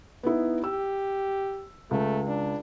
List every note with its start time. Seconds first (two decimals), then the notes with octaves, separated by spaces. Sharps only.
0.23 B3 D#4 E4
0.64 G4 E6
1.91 C#2 A3
2.28 D4